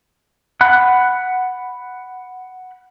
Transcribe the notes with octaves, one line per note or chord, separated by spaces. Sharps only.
F#5 B5 F#6